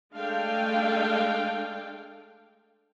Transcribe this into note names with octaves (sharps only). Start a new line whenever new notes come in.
G#3 A3 D4 A4 F5 G5